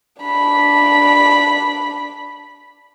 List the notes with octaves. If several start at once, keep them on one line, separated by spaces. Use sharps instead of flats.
D4 B5